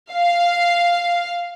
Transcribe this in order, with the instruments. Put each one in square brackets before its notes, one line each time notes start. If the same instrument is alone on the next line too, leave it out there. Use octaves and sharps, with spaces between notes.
[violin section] F5